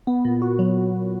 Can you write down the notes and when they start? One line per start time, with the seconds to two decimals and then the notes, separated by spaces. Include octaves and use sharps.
0.07 B3
0.25 A#2
0.42 F#4
0.59 F#3